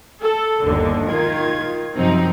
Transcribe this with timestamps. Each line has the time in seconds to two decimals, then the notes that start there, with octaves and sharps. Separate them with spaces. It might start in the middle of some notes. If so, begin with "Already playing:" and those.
0.22 A4
0.64 G1 D#2 D3
1.09 D#3 F4 G#6
1.95 F#2 C3 F3 F#3 C4 D#4